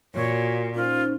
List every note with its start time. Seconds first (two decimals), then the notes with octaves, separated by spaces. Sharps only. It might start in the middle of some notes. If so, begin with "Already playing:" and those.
0.15 A#2 F#4 C#5
0.75 C#4 D#4 F4 C5